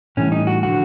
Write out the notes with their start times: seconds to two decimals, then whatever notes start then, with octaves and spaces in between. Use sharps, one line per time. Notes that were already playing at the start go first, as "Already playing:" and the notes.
0.17 A2 E3 G3 C#4
0.32 D#4
0.47 F#4
0.63 D3 F3 F#4